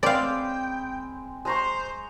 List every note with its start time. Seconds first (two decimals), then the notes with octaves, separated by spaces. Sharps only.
0.03 G#3 C4 D5 F5 G5 B5
1.45 G#3 C5 A#5 C#6